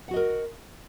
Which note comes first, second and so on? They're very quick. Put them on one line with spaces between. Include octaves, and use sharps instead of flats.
F#5 F#4 D#5 A#4